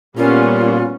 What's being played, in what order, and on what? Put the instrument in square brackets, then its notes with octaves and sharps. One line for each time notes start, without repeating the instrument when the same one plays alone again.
[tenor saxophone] A#2 [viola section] G3 B3 C#4 [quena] F4